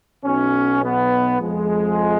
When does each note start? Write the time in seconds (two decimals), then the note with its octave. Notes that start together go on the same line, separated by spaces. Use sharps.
0.23 B1 B2 C#4
0.83 B3
1.40 F2 F3 G#3